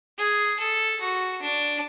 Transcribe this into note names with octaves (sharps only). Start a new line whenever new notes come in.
G#4
A4
F#4
D4